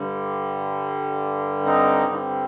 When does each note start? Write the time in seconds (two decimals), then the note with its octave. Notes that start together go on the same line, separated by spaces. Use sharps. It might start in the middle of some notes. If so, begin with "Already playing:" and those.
Already playing: G2 D3 G3
1.65 C4 D#4
2.12 C4